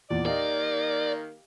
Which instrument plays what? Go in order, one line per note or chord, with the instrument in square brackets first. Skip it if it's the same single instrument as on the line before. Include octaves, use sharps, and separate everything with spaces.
[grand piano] E2 A#2 [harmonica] D5
[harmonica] D#3 A#3 [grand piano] G4 D#5 F5 [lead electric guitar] D5